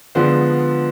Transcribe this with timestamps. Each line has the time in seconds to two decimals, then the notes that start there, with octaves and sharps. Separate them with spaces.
0.15 D3 F3 G#3 B3 C5